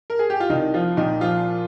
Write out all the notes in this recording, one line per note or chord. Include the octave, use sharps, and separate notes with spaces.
A#4
G#4
G4
F4
C2 D#3 D#4
F3 F4
A#2 D#3 D#4
F3 F4